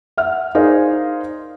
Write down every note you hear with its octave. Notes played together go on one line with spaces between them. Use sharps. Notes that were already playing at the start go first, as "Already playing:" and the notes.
E5 F#5 F6
D#4 G#4 A#4 C5 D5 F5